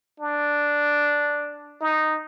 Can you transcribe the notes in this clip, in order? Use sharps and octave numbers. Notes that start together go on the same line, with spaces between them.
D4
D#4